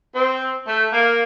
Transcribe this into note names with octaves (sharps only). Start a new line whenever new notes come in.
C4
A3
A#3